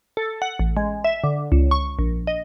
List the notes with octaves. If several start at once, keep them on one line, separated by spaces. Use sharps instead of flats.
A4
F#5
A1
G#3
E5
D3
C#2
C#6
A#1
D#5